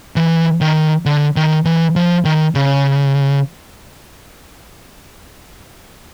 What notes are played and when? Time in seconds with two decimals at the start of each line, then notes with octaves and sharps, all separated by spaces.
0.16 E3
0.61 D#3
1.06 D3
1.36 D#3
1.65 E3
1.96 F3
2.25 D#3
2.55 C#3